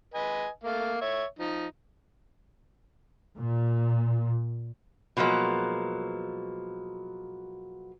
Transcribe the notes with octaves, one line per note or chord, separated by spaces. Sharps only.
B4 D#5 G#5
A3 A#3 F5
C#5 E5
F3 D#4
A#2
B2 F3 F#3 G#3 A#3